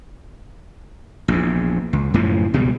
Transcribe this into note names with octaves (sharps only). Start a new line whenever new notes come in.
A#1 E2
C#2
F#2 A2 C#3 F3
C#2 B2 G3 G#3